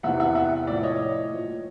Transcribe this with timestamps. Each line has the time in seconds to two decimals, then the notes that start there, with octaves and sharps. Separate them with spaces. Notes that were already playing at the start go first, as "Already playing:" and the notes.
0.03 E2 C3 E3 E5 F#5
0.20 E5 F#5
0.35 E5 F#5
0.67 A2 F3 D5 E5
0.83 C#5 D#5
1.31 A#2 F3